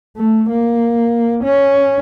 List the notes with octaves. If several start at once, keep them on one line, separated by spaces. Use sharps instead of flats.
A3
A#3
C#4